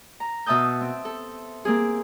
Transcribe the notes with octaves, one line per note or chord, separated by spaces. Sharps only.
A#5
B2 E5 A5 D#6 G6
C4
A4
A#3 C4 G#4